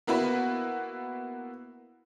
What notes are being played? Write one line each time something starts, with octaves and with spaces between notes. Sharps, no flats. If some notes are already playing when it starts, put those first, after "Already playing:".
A#3 B3 E4 F#4 B4